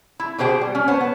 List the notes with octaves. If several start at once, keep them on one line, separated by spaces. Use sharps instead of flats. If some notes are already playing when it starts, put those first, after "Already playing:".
E4
B2 G4 G#4 C5 G5
G3
C#4
B3 C5 C#5 A5
B3